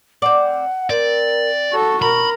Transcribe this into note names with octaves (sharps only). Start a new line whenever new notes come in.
C4 D5 F#5
C4 A#4 D5
F#4 A4 C#6
B2 A#4 B5